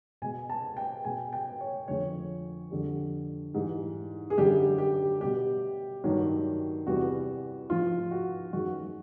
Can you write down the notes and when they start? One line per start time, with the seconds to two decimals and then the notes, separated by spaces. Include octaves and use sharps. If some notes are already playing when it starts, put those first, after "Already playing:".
0.22 B2 G#3 G#5
0.50 A5
0.77 G5
1.04 B2 G#3 G#5
1.33 G5
1.61 C#5
1.88 F2 D3 F3 G#3 C#5
2.71 F2 D3 G3
3.54 G#2 E3 G3
4.30 G#4
4.38 F#2 D3 G3 G4
4.78 G4
5.20 B2 G3 G4
6.04 G2 D#3 F#3
6.86 E2 C3 E3 G3 F#4
7.70 G#2 F3 G#3 F4
8.11 F#4
8.53 F#2 D#3 G#3 F#4